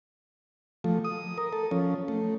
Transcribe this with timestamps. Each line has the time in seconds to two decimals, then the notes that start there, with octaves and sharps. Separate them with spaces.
0.84 F3 A3
1.04 D#6
1.38 A#4
1.53 A4
1.71 F3 C#4
2.08 A3